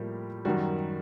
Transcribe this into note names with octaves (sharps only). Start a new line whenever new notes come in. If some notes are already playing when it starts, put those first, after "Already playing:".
Already playing: A2 F3 G3 A#3 G4
F#2 D#3 G3 F#4